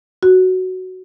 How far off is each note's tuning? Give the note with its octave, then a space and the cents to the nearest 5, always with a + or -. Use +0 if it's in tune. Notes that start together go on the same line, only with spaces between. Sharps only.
F#4 +5